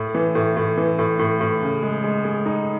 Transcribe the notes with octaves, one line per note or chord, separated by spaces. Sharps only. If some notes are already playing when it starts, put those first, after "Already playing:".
Already playing: A2
E3
A2
A2
E3
A2
A2
A2
C#3
G#3
G#3
G#3
D#4